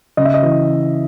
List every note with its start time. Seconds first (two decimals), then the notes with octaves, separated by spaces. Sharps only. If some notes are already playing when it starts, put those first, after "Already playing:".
0.17 C#3 D#5
0.25 E5
0.34 D#5
0.43 E3